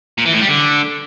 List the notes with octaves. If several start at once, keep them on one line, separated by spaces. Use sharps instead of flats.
A#2
E3
A2
G3
D3